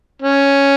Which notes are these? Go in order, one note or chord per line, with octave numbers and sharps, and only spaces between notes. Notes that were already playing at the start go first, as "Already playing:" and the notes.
C#4